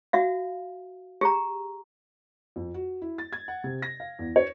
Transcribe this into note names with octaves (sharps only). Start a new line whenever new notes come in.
F#4 E5 F5
G4 G#4 A#5
F2
F#4
E4
A6
G#6
F#5
C3
A#6
F5
E2
C#5